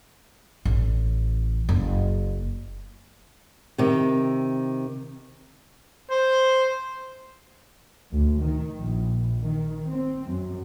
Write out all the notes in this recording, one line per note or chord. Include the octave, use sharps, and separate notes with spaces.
A1
F#1
C3 D#3
C5
D2
D#3
A#1
D#3
C4
F#2